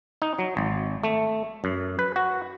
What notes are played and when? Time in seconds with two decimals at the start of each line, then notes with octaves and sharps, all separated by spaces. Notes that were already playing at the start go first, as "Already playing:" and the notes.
0.22 D#4
0.39 F#3
0.57 G#1
1.04 A3
1.64 F#2
1.99 B4
2.16 F#4